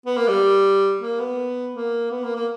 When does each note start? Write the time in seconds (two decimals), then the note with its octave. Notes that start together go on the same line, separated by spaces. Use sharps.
0.06 B3
0.17 A#3
0.28 G3
1.01 A#3
1.19 B3
1.74 A#3
2.11 B3
2.23 A#3
2.35 A#3